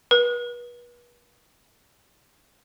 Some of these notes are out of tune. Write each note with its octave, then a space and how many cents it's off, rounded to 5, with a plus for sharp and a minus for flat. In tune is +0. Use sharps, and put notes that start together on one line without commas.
B4 -35